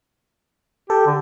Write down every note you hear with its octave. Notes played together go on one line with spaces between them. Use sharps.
G4 A4
D3